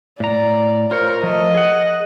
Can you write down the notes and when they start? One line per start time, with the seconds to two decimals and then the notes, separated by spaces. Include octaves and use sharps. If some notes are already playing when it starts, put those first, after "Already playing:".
0.20 A2 D5 A#5
0.91 F4 A#4 C5 C#5
1.23 F3 A3 D#5
1.54 G#4 F#5